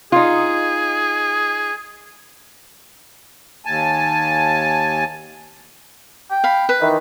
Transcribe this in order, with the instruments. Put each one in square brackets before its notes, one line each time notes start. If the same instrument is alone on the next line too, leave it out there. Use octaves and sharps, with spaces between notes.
[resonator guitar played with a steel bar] D#4 F4 [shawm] G#4
[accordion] D#2 G#5 A5
[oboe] G5
[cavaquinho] F5 B5
B4
[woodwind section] D#3 E3